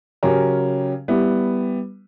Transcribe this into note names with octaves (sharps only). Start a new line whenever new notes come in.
C#3 F#3 C#4 G4 A#4
G3 B3 E4